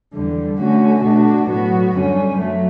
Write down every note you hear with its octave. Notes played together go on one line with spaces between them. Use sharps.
E2 D3 G3
D3 A3 C#4 F#4
B2 A3 D4 F#4
A2 F#3 B3 F#4
F#2 D3 G3 C#4
F#3 A3